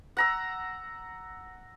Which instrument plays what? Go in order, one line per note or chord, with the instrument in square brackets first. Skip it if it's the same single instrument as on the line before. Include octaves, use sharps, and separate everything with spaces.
[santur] F#5 A#5 E6